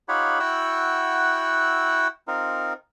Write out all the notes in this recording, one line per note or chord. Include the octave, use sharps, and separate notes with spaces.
D#4 F4 G4 C#5 F#5 B5
E4 F#4 F#5 G5 E6 F#6
C4 D#4 F4 A#4